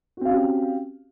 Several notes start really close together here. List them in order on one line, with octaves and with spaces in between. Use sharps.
F#4 C4 F5 C#4 G4